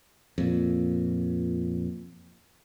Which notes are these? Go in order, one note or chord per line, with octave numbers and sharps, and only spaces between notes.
F2 A#2